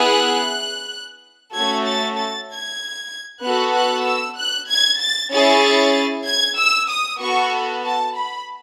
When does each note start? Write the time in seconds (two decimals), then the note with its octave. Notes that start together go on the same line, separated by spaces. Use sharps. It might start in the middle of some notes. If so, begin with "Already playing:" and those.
Already playing: B3 E4 G#4 F#6
1.53 A3 C#4 F#4 A4 G#6
1.86 A6
2.17 A6
2.49 G#6
3.42 B3 F#4 A4 F#6
3.75 F#6
4.06 E6
4.38 F#6
4.69 G#6
5.00 A6
5.33 C#4 E4 G#4 A6
6.26 G#6
6.58 E6
6.90 D#6
7.21 B3 F#4 A4 C#6
7.85 A5
8.16 B5